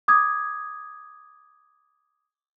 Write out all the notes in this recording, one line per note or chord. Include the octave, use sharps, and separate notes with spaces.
D6 D#6 G#6